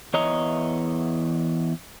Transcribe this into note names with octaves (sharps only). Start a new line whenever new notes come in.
E2 E3 C#5 D#5 A#5